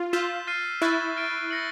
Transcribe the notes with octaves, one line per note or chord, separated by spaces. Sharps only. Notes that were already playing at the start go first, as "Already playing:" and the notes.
Already playing: F4
F4 E6 G6 B6 E7 G7
F6 A6 C7 D#7
E4 C#6 F#6 A6
F6 A6 D7
G6 A#6 C#7 F#7